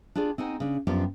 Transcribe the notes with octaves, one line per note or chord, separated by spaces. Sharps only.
D4 F4 G4 G#4 D5
C4 D#4 F#5 G#5
C#3 D4
F#2 F3 B3 D4 F4 G4